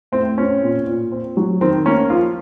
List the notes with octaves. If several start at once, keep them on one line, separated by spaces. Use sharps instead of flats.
A2 C4
C4 C#4
A#2
A#2
C4
F#3
D#3 C4
A#3 C#4
F3 F4